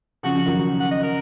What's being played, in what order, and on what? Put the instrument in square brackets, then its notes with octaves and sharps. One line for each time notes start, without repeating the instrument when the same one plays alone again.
[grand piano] C#3 F3 [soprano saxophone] F#4
[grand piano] D#3 F#3
[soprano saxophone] F#5
D#5
A#4